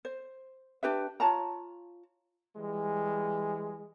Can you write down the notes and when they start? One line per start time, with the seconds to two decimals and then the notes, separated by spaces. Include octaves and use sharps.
0.05 C5
0.83 D4 G4 B4 E5
1.20 F4 C#5 A5 A#5
2.56 E3 G3 G#3